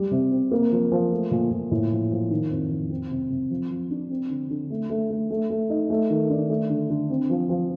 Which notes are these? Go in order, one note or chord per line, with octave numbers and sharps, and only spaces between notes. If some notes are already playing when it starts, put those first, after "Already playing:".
Already playing: G3
C3
C4
A#3
F3
F3
A3
A#2
A#2
A2
F3
F3
D#3
F2
F2
C4
C3
C3
F3
F3
D4
C4
D3
D3
A3
A3
A3
A3
A3
D#4
A3
D#3
D4
A3
D3
D3
C4
F3
F3